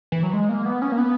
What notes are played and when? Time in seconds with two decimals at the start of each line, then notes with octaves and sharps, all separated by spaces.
0.12 E3
0.23 F#3
0.33 G#3
0.49 A#3
0.65 B3
0.82 C#4
0.92 A#3
0.98 B3